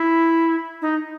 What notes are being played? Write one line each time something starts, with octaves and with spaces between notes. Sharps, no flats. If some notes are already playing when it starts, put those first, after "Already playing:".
Already playing: E4
D#4